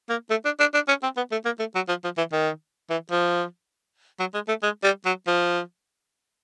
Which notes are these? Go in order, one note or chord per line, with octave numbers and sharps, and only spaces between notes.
A#3
A3
D4
D4
D4
C#4
C4
B3
A3
A#3
A3
F#3
F3
F3
E3
D#3
E3
F3
F#3
G#3
A3
G#3
G3
F#3
F3